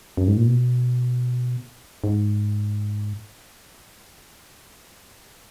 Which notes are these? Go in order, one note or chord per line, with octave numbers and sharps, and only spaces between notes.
F#2
G#2
A#2
B2
G#2